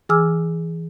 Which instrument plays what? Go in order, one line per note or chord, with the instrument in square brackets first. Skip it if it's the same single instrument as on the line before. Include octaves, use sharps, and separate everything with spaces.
[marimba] E3 G#4 G#5 D6 E6 F6